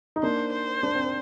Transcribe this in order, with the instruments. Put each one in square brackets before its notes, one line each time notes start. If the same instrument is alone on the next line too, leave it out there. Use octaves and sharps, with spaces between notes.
[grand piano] D#4
[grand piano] A#3 D4 [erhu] C5
[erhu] C5
[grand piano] D4
C4